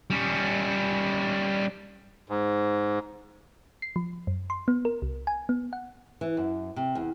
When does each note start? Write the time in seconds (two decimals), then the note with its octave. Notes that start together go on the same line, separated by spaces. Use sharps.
0.10 G3 C#4
2.29 G#2
3.82 C7
3.96 F3
4.27 F#2
4.50 C6
4.68 B3
4.85 A#4
5.02 C2
5.27 G#5
5.49 B3
5.73 F#5
6.21 E3
6.37 F#2
6.76 C3
6.95 E2